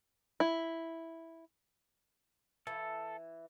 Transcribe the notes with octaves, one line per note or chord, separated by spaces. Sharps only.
E4
E3 A4